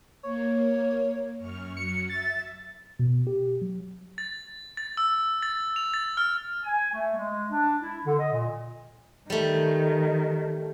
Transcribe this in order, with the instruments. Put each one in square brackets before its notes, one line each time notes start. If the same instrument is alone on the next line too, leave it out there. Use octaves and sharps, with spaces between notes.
[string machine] A#3 [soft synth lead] C#5
[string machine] F#2 C#6 F6
[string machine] F#3 [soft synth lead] C#7
[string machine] E5 [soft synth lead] A6
[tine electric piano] B2
G4
F#3
[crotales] A6
A6
E6
A6
F7
A6
F6
[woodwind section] G#5
A3
G#3
D4
E4
D3
D#5
A#2
[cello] D#3 [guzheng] G3 A3